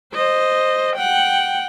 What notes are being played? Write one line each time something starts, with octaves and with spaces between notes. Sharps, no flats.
C5 D#5
F#5 G5